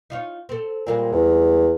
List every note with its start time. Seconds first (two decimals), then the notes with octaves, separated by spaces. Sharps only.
0.10 D#4 F4 C#5
0.49 C4 A4
0.87 A#2 G3 G#3 C4
1.12 E2